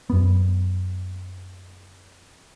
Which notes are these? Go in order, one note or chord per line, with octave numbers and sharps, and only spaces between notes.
F#2 B3